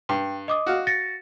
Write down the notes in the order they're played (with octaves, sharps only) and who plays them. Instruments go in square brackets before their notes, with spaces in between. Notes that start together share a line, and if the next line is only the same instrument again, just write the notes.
[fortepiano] G2 [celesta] G5
[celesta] D#5 D6 D#6
[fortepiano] F#4 F5
[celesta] A6 A#6 C#7